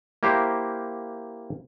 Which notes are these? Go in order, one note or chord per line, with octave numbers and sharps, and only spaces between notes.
A#3 E4 G4 A#4 C5